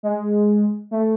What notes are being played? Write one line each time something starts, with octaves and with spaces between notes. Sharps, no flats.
G#3
A3